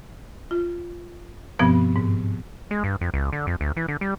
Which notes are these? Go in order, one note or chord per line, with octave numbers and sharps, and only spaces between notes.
F4
G2 B2 F3 B3 C4
G#2
G#3
G2
F2
C#2
D3
F2
D2
E3
D3
G3